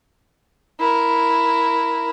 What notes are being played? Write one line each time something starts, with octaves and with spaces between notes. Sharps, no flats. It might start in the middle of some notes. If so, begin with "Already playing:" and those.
E4 A#4